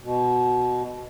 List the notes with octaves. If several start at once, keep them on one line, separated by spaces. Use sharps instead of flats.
B2